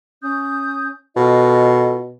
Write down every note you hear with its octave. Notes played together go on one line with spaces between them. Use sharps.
C#4 D#6 G6
B2 F4 A4 D#5